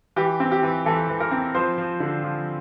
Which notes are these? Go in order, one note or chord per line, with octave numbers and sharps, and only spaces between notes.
E3 G4
C4
G4
E3
E3 A4
E3
A#4
C4
F3 C5
F3
D3
F3